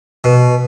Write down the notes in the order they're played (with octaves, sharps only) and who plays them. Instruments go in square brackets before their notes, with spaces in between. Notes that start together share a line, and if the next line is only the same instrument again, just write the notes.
[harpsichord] B2